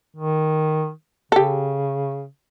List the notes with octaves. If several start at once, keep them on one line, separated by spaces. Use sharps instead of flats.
D#3
C#3 G4 A4